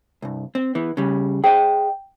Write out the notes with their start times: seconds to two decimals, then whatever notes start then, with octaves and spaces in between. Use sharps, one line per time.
0.22 C2 G2
0.55 C4
0.75 E3 B3
0.97 C#3 G3
1.44 G#4 C5 D#5 G5